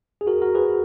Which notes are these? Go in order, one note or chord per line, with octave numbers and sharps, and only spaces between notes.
G#4
F#4 A#4
F#4 A#4
G#4 B4